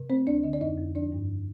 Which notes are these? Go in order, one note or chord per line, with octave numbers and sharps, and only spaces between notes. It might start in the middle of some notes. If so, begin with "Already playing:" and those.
Already playing: C3
A3 C4 C5
D2 D4 D5
D3 D#5
D5
F2 D#4 D#5
F2
F3 D4 D5
G2